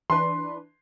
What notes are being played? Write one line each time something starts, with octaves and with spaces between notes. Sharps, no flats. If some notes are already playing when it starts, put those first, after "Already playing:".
E3 D4 B4 C6